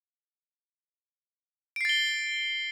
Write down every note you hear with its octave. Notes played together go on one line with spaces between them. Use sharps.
A6 C7 D7 G7